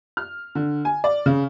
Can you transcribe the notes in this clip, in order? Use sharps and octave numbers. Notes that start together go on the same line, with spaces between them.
F6
D3
G#5
D5
C#3